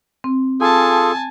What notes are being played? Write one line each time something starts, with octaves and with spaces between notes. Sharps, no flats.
C4
F4 G#4 A4 G#5 A5